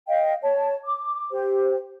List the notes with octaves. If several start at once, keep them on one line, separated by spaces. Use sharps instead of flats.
D#5 F5 G5
C#5 A5
D6
G4 C5